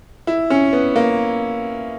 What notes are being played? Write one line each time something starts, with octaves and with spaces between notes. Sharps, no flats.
E4
C#4
B3
A#3